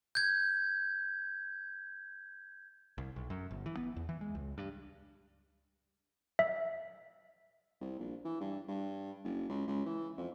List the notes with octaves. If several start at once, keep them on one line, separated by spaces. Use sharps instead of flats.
G6 G#6
C2
B1
F#2
G1
E3
B3
E2
E3
G#3
C#2
G2
E5
C2
A#1
E3
G2
G2
F#1
C#2
C#2
E3
F2